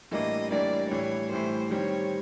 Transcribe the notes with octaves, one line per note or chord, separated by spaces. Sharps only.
A2 E3 G3 A#3 D4 D#5
A2 E3 G3 A#3 D4 D5
A2 E3 G3 C#5
A2 E3 G3 C5
D#3 G3 C4 C#5